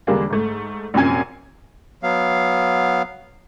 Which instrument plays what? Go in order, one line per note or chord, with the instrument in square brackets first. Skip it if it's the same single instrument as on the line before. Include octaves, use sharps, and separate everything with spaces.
[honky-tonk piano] E2 D3 G3 G#3 A#3 D4
G#2 A3
A#1 F#2 C3 G#5 G#6
[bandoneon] F#3 B3 F5